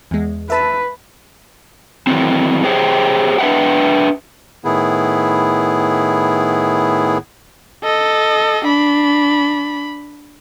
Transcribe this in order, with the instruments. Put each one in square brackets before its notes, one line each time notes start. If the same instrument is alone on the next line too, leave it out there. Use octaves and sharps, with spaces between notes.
[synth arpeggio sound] E2 G#3
[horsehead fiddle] B4 [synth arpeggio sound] E5 A5
[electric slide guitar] D#3 E3 F#3 C4
G4 G#4 C5 C#5 G5
D4 B4 E5 F#5 G5
[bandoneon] A2 D#3 B3 E4 G#4
[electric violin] A4 D#5
D4 B5